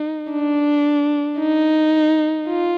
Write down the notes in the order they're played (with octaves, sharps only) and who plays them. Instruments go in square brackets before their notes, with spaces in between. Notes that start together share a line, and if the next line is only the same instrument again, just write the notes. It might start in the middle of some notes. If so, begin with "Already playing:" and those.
Already playing: [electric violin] D#4
D4
D#4
F4